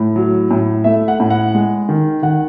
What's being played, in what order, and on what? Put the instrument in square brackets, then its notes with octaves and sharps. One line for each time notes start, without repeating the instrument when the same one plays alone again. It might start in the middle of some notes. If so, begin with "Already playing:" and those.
Already playing: [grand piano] A2 A3
F#3
A2
A3 E5
F#5
A2
F#5
G#3
D#3
D#3 F#5